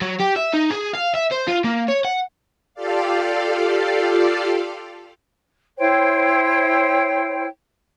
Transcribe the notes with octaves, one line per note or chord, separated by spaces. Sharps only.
F#3
G4
E5
D#4
G#4
F5
E5
C5
F4
A#3
C#5
F#5
F4 G4 A4 D5 F5
E4 C5 C#5 G5